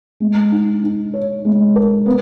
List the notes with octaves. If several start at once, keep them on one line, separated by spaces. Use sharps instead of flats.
G#3
D#4
D#4
C#5
G#3
A#4
B3